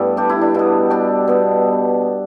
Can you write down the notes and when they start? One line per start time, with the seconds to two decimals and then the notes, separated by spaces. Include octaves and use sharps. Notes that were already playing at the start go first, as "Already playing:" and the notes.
Already playing: G2 G3 A3 B3 E4 A4
0.17 D4 G4
0.30 E4
0.41 D4
0.54 B2 B3 E4
0.90 D4 G4
1.28 B2 B3